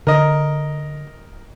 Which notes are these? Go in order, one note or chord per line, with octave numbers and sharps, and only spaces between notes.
D3 A#4 D#5